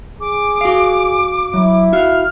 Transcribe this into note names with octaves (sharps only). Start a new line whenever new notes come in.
G#4 D6
F#4 F5
F#3 E4
F#4 E5 F5 F6